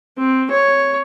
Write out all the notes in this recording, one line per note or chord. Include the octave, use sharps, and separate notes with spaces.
C4
C#5